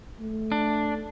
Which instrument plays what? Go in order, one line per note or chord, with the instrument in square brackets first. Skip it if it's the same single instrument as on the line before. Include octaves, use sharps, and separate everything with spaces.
[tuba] A3
[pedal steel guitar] D4